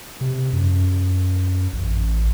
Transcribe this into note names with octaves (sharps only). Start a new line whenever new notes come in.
C3
F#2
A1